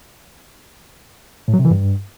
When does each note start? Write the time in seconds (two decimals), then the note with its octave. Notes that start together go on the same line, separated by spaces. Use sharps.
1.48 A2
1.54 F#3
1.59 C3
1.65 E3
1.70 G2